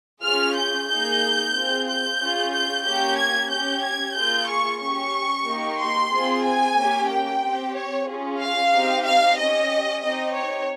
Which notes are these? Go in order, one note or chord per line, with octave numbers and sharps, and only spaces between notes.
C#4 F4 G#4 F6
G6
A#3 D#4 G#4 G6
C4 F4 G#4
G6
C#4 F4 G#4
G6
A#3 C#4 G4 G6
G#6
C#4 G4 G6
G#6
A#3 F4 G#4 G6
C#6
C#4 G4 C#6
A#3 D#4 G4
C6
C4 F4 G#4
G#5
A#3 C#4 G4
G5
C4 G4
C#5
C#4 F4 G#4
F5
C4 D#4 G4
F5
C#4 G4 D#5
C4 D#4 G4 D#5
C#5